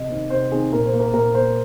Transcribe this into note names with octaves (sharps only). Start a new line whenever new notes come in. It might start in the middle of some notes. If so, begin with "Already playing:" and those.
Already playing: C3 D#5
D#3 C4
C3 C5
D#3 C4 G#4
A#2 A#4
C5
A#3
A#4
A#2 A#4
A#3 C5